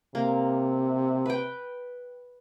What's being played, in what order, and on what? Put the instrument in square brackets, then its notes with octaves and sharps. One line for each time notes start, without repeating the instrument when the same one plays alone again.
[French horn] C3 [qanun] A#3
[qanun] B4 G5